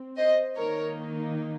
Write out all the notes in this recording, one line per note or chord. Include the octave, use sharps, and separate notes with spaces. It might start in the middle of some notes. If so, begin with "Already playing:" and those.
Already playing: C4
C5 D#5
D#3 A#3 D#4 A#4 C#5